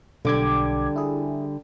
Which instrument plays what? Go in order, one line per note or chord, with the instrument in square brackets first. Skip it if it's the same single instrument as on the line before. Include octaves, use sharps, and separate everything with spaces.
[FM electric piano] B1 D6 G#6 [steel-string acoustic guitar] D3 G3
[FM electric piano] E4 G#4